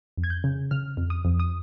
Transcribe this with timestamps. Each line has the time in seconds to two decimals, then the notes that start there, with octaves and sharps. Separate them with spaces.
0.17 F2
0.24 G#6
0.30 G6
0.44 C#3
0.71 C#3 F6
0.97 F2
1.10 D#6
1.25 F2
1.40 D#6